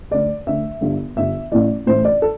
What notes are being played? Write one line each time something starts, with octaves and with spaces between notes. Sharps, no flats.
D2 D3 D5
D2 D3 E5
G1 G2 D3
G1 G2 D3 E5
A1 A2 E3 D5
A1 A2 E3 C5
D5
A4